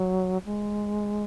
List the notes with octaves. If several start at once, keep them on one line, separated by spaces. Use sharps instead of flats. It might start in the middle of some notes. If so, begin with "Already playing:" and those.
Already playing: F#3
G#3